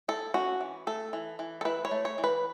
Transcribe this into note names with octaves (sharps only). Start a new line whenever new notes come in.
E4 A4
C#4 F#4
E3
A3 A4
E3
E3
A4
E4 B4
C#5
A3
C#5
E3
B4